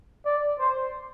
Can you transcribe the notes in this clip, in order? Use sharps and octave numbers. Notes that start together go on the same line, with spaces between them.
D5
C5